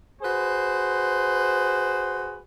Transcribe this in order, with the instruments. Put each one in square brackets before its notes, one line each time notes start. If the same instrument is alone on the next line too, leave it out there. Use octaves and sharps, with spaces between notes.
[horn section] F#4 G#4 B4 C5